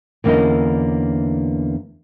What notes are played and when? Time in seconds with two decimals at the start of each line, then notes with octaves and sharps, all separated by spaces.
0.24 E2 D3 A#3 C#4 E4 D#5